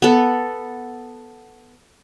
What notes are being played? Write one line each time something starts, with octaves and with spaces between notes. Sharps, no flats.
B3 A4